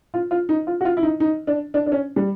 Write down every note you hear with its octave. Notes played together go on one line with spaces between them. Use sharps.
F4
F4
D#4
F4
F#4
F4
E4
D#4
D#4
D4
D4
D4
C#4
G3